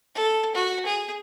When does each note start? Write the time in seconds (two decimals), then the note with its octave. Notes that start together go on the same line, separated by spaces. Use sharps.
0.15 A4
0.55 F#4
0.85 G#4